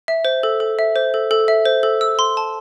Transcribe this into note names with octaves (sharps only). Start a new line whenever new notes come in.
E5
C5
A4
A4
E5
C5
A4
A4
E5
C5
A4
E6
C6
A5